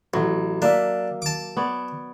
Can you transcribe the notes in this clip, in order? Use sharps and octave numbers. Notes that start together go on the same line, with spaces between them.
A1 F#3
A#3 D4 E5
A5 D6
B3 C#5 D5